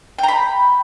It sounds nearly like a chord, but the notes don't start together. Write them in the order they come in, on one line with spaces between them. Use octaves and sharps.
G5 A#5 B5